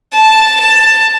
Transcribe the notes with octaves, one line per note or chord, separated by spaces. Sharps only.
A5
A5